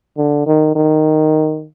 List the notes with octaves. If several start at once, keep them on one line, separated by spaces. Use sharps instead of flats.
D3
D#3
D#3